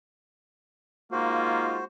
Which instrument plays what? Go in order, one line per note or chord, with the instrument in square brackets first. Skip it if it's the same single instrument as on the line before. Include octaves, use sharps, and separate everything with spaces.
[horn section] G#3 D#4 F4 [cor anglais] A#3 [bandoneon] F#4 C5